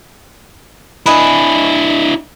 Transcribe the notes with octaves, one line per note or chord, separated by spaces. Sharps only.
D4 E4 B4 D#5 G#5